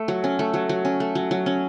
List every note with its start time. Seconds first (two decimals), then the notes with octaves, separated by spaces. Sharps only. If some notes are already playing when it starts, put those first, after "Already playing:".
Already playing: A3
0.08 F#3
0.24 C#4
0.39 A3
0.54 F#3
0.69 F#3
0.85 C#4
1.00 A3
1.15 F#3
1.31 F#3
1.46 C#4